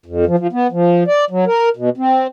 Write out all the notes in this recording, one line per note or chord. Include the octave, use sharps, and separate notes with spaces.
F2
F3
F3
B3
F3
D5
F#3
A#4
B2
C4